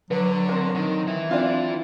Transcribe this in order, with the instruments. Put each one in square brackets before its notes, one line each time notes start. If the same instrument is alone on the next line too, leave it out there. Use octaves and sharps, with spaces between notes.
[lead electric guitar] D3 [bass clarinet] F#3 [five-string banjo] B4
[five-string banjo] C4 A#4
[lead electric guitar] D#3
E3 E4
[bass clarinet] C4 [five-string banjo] D4 F4